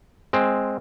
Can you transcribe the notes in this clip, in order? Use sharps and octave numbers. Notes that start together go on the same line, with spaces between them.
G#3 C4